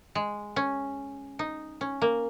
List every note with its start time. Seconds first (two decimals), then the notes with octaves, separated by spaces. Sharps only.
0.15 G#3
0.56 C#4
1.39 D#4
1.81 C#4
2.02 A#3